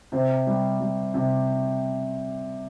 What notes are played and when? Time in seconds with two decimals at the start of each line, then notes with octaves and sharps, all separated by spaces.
0.12 C3 C5
0.47 G3
0.80 G3
1.14 C3